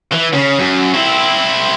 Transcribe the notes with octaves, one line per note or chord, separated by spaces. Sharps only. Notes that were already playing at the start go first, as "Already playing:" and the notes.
E3
C#3
F#2
C4 E4